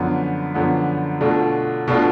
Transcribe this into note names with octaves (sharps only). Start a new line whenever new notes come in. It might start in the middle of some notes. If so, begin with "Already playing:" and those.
Already playing: F#2 D3 F3 B3
F#2 D3 F3 B3
B2 A3 D4 F4
B2 A3 D4 F4